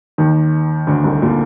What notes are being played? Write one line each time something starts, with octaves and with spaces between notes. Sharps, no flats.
D#2 D#3
D2 D3
C2 C3
A#2